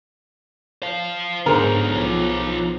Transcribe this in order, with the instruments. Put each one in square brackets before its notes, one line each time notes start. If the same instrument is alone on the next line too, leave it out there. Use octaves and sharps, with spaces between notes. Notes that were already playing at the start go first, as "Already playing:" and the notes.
[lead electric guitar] C5 F5
[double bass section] G#2 [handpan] D3 G#4 C5 [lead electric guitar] B3 D#4 [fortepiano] A#4
[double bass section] B1 F3 B3 [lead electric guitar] D#4 C#5